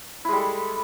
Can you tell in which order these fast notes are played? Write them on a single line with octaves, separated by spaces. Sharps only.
E4 G#3 G3 A4